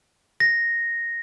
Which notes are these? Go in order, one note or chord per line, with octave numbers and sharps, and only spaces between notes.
A#6